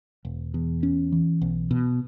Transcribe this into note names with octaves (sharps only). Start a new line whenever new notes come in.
E1
E2
C#4
E3
B1
B2